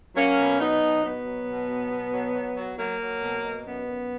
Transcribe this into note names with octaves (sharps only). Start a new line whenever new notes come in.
F#3 A#3 C#4
B2
F#3 B3 D#4
B2
B2 B3
F#3
B2
F#3
B2
F#3
F#3
F#3
F#3 A#3
F#3
B2
B2
F#2 B3
F#2